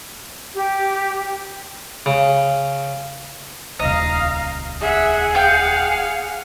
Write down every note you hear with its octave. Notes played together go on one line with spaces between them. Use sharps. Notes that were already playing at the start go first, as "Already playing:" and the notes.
G4
C#3
D#1 C#2 D#5 F5 A#5
G#4 E5 F#5
F5 G5 G6